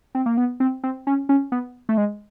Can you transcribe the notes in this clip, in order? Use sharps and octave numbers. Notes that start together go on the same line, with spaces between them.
C4
A#3
B3
C4
C4
C#4
C#4
B3
A3
G#3